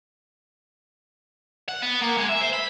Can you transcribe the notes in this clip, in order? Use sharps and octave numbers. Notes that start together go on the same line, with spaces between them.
F#5
B3
A#3
G#3
E5
C5
B5